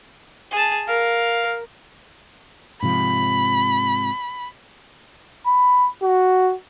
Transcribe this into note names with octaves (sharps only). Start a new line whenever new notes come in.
G#4 A5
A#4 F5
G#2 C3 F3 B5
B5
F#4